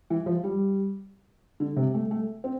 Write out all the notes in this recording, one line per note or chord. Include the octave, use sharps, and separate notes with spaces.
E3
F3
G3
D3
C3
A3
A3
C4